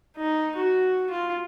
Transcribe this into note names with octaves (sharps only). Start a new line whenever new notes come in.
D#4
F#4
F4